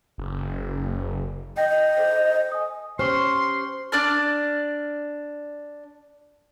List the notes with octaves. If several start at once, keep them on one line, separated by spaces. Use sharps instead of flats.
F#1
D#5 G5 G6 A#6
D#5
A4 C5 G6
G#5 D#6
C#4 G4 C5 C6 C#6 F6
D4 D5 D6 F6